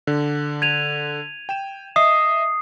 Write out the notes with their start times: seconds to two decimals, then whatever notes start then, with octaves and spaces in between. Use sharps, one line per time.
0.07 D3
0.62 G#6 D#7 F7
1.49 G5 E7
1.96 D#5 E5 D#6 C7